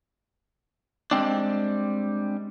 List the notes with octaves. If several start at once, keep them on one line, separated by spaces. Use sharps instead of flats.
G3 G#3 C4 D4